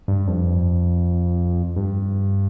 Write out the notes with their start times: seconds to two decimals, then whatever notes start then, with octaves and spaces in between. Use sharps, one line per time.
0.08 G2
0.28 F2
1.76 G2